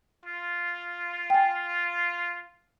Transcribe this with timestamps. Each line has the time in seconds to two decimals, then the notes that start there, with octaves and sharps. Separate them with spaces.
0.25 F4
1.30 G5 G#5